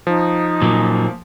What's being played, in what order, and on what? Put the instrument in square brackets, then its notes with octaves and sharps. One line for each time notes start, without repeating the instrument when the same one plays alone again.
[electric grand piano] F3 [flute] D#4
[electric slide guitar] A#2 F#3 A#3